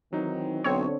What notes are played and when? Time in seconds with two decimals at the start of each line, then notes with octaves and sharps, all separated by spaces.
0.13 D#3 E3 F#3 C4 D#4
0.64 B1 D3 C4 C#5